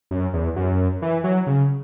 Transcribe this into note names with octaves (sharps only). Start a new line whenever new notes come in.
F#2
E2
F#2
E3
F#3
C#3